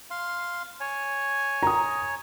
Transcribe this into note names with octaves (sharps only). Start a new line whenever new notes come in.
F5 C6
C#5 G#5
A#5 D#6